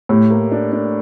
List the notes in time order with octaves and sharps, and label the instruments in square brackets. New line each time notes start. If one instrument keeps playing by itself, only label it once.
[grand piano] A2 [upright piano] G4
[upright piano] A#3
D4
D4